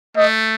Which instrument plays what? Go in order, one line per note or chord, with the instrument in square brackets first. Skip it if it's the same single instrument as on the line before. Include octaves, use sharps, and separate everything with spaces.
[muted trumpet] A3 [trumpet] D#5